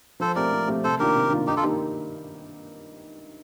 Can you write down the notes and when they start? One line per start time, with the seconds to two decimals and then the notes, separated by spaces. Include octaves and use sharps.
0.20 F3 A4 C5
0.36 A3 C4 G4 A#4 D5
0.53 F3
0.68 A3 C4 G4
0.84 C3 A4 C5
0.99 D#3 A#3 D4 F4 G4 A#4
1.15 C3
1.31 D#3 A#3 D4 F4
1.47 G2 D#4 G4
1.57 F4 A4
1.63 D#3 A#3 D#4 G4